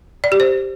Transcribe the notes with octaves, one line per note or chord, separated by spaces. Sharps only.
D5
G4
C5